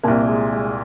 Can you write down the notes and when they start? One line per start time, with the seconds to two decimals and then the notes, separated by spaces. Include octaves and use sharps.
0.04 C2 A#2 A#3
0.28 G#3
0.52 G#3